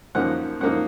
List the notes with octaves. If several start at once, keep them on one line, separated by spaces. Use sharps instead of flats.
F#2 F3 A#3 D#4 F#5
F#2 F3 A#3 D#4 F#5